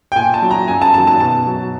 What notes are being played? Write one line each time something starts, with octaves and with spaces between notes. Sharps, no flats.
G5
A#2 G#5
A5
F#3
A#5
F#2 G#5
A5
D#3 F#3 A5
A5
B2 A5
F#3